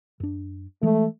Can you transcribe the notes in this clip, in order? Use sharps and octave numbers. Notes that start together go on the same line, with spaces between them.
F#2 D4
E3 G#3 A3